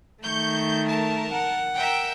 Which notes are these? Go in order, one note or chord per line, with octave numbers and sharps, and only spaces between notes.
D#3 A3 C#6 G6
A#4 A5
F#5
A#4 E5 G5